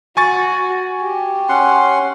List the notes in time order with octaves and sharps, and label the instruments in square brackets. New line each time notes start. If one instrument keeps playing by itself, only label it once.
[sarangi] F#4 [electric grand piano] G#5 C#6 A6
[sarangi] G4
[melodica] C#4 F#5 C6